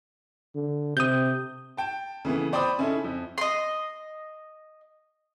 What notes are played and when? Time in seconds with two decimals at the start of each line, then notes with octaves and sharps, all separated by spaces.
0.55 D3
0.97 C3 D#6 G6
1.77 G5 A5
2.25 C#3 E3 A3 B3
2.53 C5 D5 G5 B5 C6 D#6
2.78 C#3 C#4 D#4 E4 A4
3.04 F2
3.38 D#5 C6